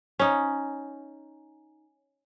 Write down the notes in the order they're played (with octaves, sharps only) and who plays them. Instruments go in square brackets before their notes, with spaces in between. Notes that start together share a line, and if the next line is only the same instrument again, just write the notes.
[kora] C#4 D#4